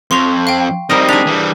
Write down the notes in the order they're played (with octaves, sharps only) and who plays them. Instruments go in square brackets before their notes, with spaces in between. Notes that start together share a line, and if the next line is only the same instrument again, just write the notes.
[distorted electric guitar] F2 [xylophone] C6 C#6 F7
[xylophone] F5 G5
[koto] G3 A#4 D#5 [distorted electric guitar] C4 D#4
[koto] D4 G#4 [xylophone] B6 F7
[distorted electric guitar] E3 G3